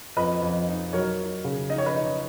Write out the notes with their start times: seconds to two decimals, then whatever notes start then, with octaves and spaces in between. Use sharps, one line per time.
0.16 F2 B4 D#5
0.42 F2
0.68 D#4
0.93 F#3 A#4 C#5
1.19 D#4
1.44 C#3
1.69 D#4 D#5
1.78 C#5
1.86 B4 D#5
1.95 D#4